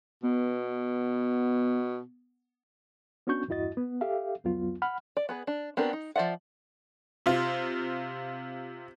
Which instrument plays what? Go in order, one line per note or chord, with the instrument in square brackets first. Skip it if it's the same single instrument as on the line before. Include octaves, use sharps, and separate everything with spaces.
[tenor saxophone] B2 [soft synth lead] B3
[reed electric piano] B3 C#4 D4 F#4 C#6 G6
E2 G2 E4 F#4 D#5 A6
B3
G4 A4 E5 F5
C2 F2 F#3 B3 F4
F#5 B5 F6
[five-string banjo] D5
B3 G#4 B4
D4
B3 C4 D4 F#4 A#4
D#4
F3 B4 D5 E5 F#5
[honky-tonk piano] C3 F4